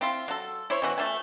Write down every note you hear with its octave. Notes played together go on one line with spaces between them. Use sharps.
C4 E4 F4
F#3 A4
E4 C5 C#5
B2 E3 F#4
A3 F4 E5 G#5